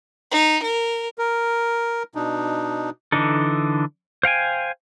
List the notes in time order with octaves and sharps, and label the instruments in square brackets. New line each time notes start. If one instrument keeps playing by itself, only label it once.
[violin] D#4
A#4
[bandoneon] A#4
B2 D4 D#4
[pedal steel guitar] D3 E3 D4 D#4 A4
C5 F5 G5 G#5